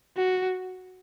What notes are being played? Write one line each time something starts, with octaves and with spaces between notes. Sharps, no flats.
F#4